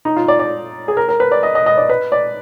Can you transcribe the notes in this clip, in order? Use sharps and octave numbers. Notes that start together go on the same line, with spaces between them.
D#4
F4
D5
D5
G#4
A#4
A#4
B4
D5
D#5
D#5
D#5
D5
B4
D5